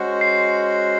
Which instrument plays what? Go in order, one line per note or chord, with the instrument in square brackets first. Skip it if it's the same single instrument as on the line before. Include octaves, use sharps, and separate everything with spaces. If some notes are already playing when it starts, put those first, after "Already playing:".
Already playing: [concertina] G#3 C#4 F#4 C5 F#5
[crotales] C7